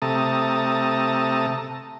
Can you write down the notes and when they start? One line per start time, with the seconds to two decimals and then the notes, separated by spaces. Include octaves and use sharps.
0.02 C3 A3 A5 A#5 D#6